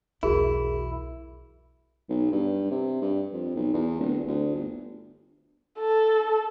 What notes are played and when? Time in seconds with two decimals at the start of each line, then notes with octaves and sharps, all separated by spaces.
0.23 B1 E2 E4 F#4 G#4 A#4
2.09 B1
2.32 G2
2.71 C3
3.02 G2
3.33 F2
3.56 B1
3.74 E2
4.00 D1
4.28 D2
4.55 G1
5.79 A4